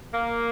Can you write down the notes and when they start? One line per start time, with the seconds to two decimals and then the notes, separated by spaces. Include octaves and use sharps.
0.14 A#3